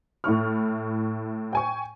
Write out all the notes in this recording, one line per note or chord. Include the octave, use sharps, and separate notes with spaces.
A2 E4 C#6 F6
G5 G#5 C#6